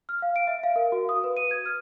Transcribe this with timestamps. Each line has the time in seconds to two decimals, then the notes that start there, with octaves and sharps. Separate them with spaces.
0.09 F6
0.22 F5
0.36 D7
0.47 E5
0.63 F5
0.76 A#4
0.92 F#4
1.09 D#6
1.24 B4
1.37 D#7
1.51 G#6
1.66 F6